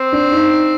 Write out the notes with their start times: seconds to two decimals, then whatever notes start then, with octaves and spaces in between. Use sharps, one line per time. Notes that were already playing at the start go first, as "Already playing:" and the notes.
Already playing: C4
0.12 D4
0.32 D#4